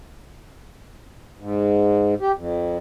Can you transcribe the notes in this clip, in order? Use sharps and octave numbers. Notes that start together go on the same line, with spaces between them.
G#2
G4
F2